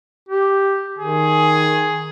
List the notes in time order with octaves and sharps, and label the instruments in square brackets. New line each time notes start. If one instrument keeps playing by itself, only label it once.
[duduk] G4
[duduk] D#3 [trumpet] G#4